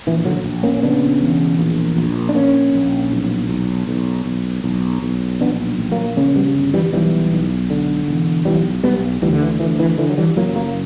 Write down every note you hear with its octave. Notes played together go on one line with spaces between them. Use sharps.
A#1 E3
D3 F#3
A#1
A#3 C#4
C#4
C#3 B3 D4
E1
A#1
A#1
D4
A#1 A#3 C#4
A#1
B1
B1
B1
B1
B1
B1
A#1 B3 D4
A#1
F#3 A#3
C#3 A#3 C#4
G3 B3
G1
E3 G3
B1 E3 G3
B1
D3
E1
B1 E3 G3
B1 G3 B3
D2 E3 G3
D3
E3
D2 E3
E3
D3 E3
F#3
E3 G3
F#1 F#3 A#3
F#3 A#3